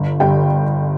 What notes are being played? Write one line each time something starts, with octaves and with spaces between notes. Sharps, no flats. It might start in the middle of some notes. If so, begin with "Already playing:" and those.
Already playing: G1
G1 G4 G5